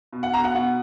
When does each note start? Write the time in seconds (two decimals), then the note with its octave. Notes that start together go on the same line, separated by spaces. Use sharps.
0.12 B2
0.23 F#5
0.33 B2 A#5
0.44 F#5
0.55 B2 F#5